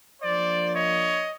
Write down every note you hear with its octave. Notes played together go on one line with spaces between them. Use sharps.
F3 A#3 D4 C5 D5
C#5 D#5